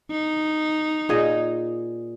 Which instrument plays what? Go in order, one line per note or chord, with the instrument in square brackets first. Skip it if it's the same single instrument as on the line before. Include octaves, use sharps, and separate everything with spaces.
[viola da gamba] D#4
[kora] A#2 G#4 D#5